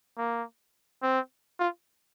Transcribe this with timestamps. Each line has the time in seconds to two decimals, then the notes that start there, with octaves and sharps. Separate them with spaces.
0.17 A#3
1.03 C4
1.60 F4